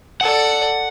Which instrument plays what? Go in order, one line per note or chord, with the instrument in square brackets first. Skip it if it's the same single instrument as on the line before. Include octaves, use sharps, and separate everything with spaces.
[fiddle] A4 D5 [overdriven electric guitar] F#5